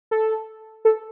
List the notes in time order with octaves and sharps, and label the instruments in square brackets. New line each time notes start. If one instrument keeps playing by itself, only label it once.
[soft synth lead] A4
A4